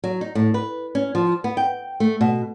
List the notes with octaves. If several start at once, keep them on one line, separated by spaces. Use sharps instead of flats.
F#3
D#4
A2
B4
C#4
F3
B3
G5
A3
B2